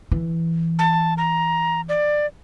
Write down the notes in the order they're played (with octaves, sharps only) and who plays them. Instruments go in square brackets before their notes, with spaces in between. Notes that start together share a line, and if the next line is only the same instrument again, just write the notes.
[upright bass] E3
[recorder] A5
A#5
D5